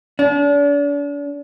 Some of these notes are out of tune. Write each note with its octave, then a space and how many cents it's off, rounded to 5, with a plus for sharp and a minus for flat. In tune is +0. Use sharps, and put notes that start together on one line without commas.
D4 -40